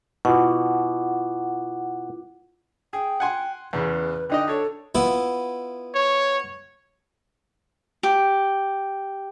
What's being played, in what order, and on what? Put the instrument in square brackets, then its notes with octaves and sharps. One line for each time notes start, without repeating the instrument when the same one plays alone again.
[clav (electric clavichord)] B2 [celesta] E4 F4 D6 [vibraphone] F#5
[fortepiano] G#4 [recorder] G5
[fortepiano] F#5 G#5 C6
[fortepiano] E2 C#3 [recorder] B4
[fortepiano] D3 D#4 D#5 [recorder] G5
[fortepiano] D4 C#5 [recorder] A4
[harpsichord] B3 E4 F4
[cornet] C#5
[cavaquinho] G4